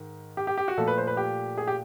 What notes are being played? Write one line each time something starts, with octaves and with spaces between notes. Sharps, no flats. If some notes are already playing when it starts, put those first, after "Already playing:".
Already playing: G#2 D#3
G4
G4
G4
F#4
A#2 F3 A3 A4
B4
C5
B4
G4
G#4
G4